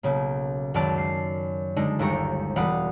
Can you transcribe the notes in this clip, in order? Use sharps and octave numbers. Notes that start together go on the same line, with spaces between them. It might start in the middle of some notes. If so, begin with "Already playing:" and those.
B1 C#3 A#3
C#2 F#2 D#3 D5 A5 F6
C7
D3 G#3 D4 D#4
G1 D#2 G4 A#5 C#6 C#7
E1 G3 F5 F#5 B5 D#6